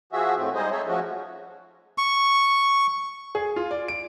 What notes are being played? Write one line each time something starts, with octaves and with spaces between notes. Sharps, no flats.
F3 F#4 G#4 E5
F2 A2 A3 C4
G3 G#3 D#4 G#4 C5 D#5
G#4 A4 C#5 E5
F3 G#3 A3 C#4 F#4
C#6
G#4
F4
D5
D7